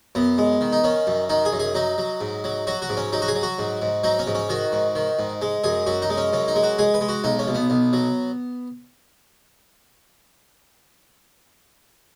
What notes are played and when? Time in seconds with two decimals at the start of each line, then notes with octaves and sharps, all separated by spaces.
0.15 F#2 B3
0.38 G#3
0.61 D#3
0.73 D#4
0.84 D#3 C#4
1.07 F#2
1.29 D#3 D#4
1.45 G#4
1.53 F#2
1.59 G#4
1.75 F#3 D#4
1.98 F#3
2.21 G#2
2.44 F#3
2.67 F#3 F#4
2.82 F#4
2.89 G#2
2.97 C#4
3.13 F#3 D#4
3.22 F#4
3.28 G#4
3.35 F#3
3.43 F#4
3.59 G#2
3.82 G#2
4.04 F#3 D#4
4.19 C#4
4.27 G#2
4.35 C#4
4.49 D#3 F#4
4.72 G#2
4.95 D#3
5.19 G#2
5.42 G#3
5.64 F#2 G#4
5.87 F#2 F#4
6.02 D#4
6.10 G#3
6.17 C#4
6.33 F#2 C#4
6.48 D#4
6.56 G#3
6.63 F#4
6.78 G#3 G#4
6.94 B4
7.01 G#3
7.09 F#4
7.24 B1 D#4
7.39 C#4
7.48 B1
7.55 B3
7.70 B1
7.93 F#3